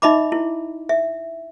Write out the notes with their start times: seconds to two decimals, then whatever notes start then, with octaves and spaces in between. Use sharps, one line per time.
0.02 D#4 D#5 E5 B5 D6
0.32 E4
0.89 E5